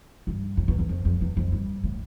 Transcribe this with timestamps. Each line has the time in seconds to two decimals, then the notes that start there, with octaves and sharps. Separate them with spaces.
0.27 G2
0.57 F2
0.68 E2
0.79 E2
0.89 F2
1.05 F2
1.21 E2
1.37 F2
1.52 G2
1.84 A2